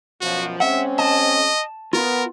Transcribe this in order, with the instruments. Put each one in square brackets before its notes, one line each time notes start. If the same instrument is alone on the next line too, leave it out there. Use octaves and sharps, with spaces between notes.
[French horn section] F#2 B2 F3 [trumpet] F#4
[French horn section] G#3 C4 C#4 [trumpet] E5 [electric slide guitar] F#5
[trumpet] D#5 [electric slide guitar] A5
[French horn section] B3 [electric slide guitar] F4 [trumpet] A#4